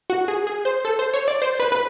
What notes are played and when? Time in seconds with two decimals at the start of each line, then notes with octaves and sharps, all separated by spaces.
0.10 F#4
0.28 G#4
0.47 G#4
0.65 C5
0.85 A4
0.99 C5
1.14 C#5
1.28 D5
1.42 C5
1.60 B4
1.72 B4